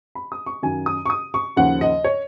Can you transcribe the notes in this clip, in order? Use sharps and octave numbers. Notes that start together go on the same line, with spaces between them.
B5
D#6
C#6
F#2 D#3 F#3 G#5
D#6
C#6
D#6
C#6
D#2 C#3 F3 F#5
D#5
C#5